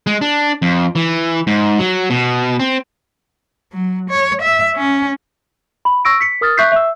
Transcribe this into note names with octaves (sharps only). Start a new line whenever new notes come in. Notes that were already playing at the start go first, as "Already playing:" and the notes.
G#3
D4
F2
E3
G#2
F#3
B2
C4
F#3
C#5
E5
C#4
B5
C#6 E6 A#6 D7
B6 C#7
A#4 D#6 F6 A6
E5 C#6 F#6 G6 B6 C7
E5 E6